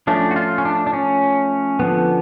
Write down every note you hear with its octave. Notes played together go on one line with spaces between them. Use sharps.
F3 A3 C#4 D4
F#4
F4
C#4
D4
D4
C#4
D3 F3 B3